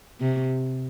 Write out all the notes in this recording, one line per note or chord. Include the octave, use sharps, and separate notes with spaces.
C3